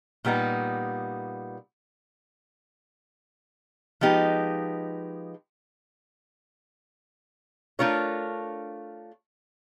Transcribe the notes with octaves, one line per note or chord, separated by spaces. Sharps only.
A#2 G3 B3 D#4
F3 G#3 B3 D#4 G4
A3 D4 F4 A#4 C#5